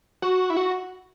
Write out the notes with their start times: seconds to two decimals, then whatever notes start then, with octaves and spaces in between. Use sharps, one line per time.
0.22 F#4
0.50 E4
0.57 F#4